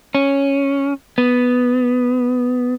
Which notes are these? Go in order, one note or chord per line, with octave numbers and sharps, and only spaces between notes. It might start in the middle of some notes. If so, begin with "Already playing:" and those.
C#4
B3